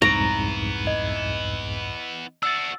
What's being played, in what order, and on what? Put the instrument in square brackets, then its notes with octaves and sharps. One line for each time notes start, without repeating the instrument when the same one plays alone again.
[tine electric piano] C2 F2 G#2 [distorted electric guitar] E3 B3 [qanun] A#5 [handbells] C#6 D7
[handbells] D#5
[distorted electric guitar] D4 F#4 [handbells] E6 A6